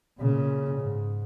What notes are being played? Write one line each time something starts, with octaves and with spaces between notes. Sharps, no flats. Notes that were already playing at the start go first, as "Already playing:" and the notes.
A#2 C#3
G#2